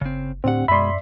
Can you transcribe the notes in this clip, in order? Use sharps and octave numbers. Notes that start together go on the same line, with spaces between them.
F#1 C#3 C4
D2 A2 C4 D4 G4 F#5
F#2 B2 G#3 D5 E5 B5 C6